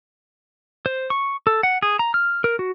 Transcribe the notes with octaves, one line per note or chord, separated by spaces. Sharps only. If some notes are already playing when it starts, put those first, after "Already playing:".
C5
C#6
A4
F#5
G#4
A#5
F6
A#4
F#4